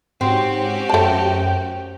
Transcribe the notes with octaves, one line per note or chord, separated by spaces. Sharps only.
G#2 C4 C#4 F#4 G4
F#2 A3 G5 A5